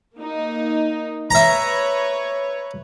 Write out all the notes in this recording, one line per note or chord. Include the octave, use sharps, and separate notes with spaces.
A#3 D#4
B4 C#5 E5 A#5